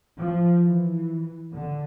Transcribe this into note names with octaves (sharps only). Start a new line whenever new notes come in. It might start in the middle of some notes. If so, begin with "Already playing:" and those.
F3
E3
D3